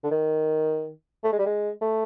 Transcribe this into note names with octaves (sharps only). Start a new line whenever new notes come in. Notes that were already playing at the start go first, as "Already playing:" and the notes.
D3
D#3
A3
G#3
G3
G#3
A3